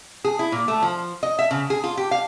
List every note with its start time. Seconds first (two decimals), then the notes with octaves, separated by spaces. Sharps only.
0.24 G#4
0.39 E4
0.52 A#2
0.68 A3
0.82 F3
1.23 D#5
1.39 E5
1.51 C#3
1.70 G#4
1.84 F4
1.97 G4
2.11 F5